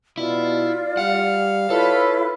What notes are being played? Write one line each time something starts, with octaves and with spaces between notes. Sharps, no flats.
B2 E4 F4 D5
G3 F5 F#5
E4 F4 A4 B4 C#5